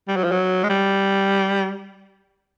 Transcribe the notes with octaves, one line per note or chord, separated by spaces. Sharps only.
G3
F#3
F3
F#3
G#3
G3